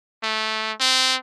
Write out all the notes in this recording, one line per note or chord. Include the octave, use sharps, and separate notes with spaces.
A3
C4